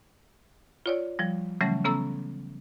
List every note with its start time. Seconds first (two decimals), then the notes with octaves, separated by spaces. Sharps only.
0.86 F4 C#5 D5
1.19 F3 G3
1.61 C#3 E3 F#3 G3 A3 C#4
1.85 C#3 B3 C#4 A4 A#5 E6